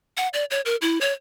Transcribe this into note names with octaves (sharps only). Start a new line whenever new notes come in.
F#5
D5
C#5
A#4
E4
C#5